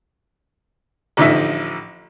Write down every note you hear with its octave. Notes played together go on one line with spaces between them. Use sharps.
A1 D3 F3 D#4 E5